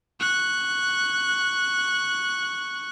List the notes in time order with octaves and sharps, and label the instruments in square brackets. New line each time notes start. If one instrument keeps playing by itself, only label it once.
[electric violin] C#6 F#6